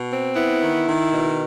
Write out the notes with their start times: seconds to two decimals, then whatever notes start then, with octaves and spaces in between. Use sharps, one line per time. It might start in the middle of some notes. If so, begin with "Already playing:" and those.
Already playing: B2
0.10 C4
0.36 B3 E4
0.63 D#3
0.87 D#3
1.13 B2